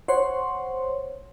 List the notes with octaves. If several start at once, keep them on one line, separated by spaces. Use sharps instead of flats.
C5 C#5 F#5 C6